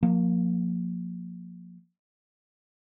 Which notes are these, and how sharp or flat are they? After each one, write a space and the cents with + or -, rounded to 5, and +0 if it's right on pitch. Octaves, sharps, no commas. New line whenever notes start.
F3 +35 A#3 +0